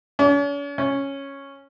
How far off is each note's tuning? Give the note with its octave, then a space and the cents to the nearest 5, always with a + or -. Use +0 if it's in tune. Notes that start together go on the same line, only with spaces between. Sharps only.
C#4 +45
C#4 -5